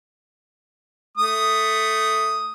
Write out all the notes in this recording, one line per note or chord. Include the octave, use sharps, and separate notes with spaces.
A3 D#6